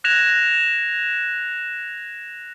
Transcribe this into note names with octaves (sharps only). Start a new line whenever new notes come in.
F#6 G#6 A#6 E7 F7